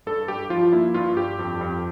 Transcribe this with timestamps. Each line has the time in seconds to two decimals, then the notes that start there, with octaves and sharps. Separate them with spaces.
0.06 G2 A4
0.28 G2 G4
0.50 F3 F4
0.73 A#3 E4
0.94 G2 F4
1.17 G2 G4
1.39 F2
1.61 F2